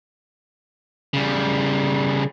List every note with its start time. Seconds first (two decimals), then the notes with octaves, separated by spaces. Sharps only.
1.14 C#3 G3